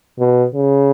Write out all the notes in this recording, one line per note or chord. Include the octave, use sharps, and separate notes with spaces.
B2
C#3